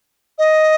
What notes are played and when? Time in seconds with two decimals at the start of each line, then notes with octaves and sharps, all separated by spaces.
0.38 D#5